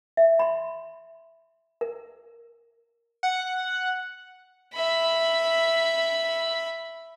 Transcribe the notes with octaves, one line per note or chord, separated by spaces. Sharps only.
E5
B5 C6
A#4
F#5
E5 B5